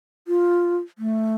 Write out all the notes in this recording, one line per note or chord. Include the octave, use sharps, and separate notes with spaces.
F4
A3